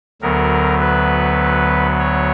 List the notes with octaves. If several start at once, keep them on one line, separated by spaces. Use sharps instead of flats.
D2 D3 F#3 B3 A#4
B4
C#5